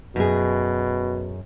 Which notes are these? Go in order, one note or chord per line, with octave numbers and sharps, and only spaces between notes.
F#2 B2 G#4